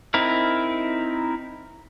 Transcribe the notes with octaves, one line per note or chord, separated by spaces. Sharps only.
C4 D#4 E4 A#4